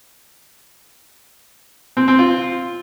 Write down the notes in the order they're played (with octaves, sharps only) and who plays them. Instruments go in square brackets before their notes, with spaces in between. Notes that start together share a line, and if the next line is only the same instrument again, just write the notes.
[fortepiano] C4
C4
F4